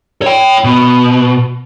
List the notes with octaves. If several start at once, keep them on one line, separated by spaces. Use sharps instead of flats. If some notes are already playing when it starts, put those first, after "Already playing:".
C#5 G5
B2